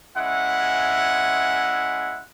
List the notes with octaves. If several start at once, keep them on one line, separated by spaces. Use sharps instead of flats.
G#3 C#4 E4 E5 F#5